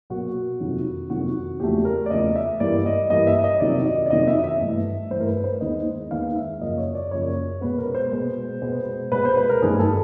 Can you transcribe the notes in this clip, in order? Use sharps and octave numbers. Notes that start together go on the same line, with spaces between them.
B2 F#3 A#3 F#4
F2 C3 D#3 F#3
F2 C3 D#3 F#3 F#4
E2 C#3 F3 A3 G4
A#4
D5
E2 C#3 F3 A3 D#5
E5
G2 E3 G3 A#3 D5
D#5
G2 E3 G3 A#3 D#5
E5
D#5
F2 C3 D#3 F#3 D5
D#5
D5
F2 C3 D#3 F#3 D#5
E5
E5
G2 E3 A3
G2 E3 A3 C5
A#4
B4
C5
D#2 D#3 G#3 B3 D#5
D#2 D#3 G#3 B3 F5
E5
F#2 C#3 F3 A#3 D#5
C#5
D5
F#2 C#3 F3 A#3 C#5
B2 G#3 B3 B4
A#4
C5
B2 G#3 B3
B2 G#3 B3
B2 G#3 B3 B4
C5
B4
A#4
G2 D#3 F#3 A3 G#4
A4